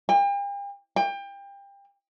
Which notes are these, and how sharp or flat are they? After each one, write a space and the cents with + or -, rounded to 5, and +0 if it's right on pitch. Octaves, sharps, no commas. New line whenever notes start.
G5 +40
G5 +25